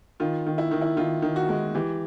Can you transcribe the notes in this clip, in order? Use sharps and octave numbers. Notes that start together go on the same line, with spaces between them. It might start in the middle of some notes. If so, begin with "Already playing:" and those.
D#3 F4
D#3
E4
D#3
E4
D#3 F4
D#3
F#4
G#3
E3 G4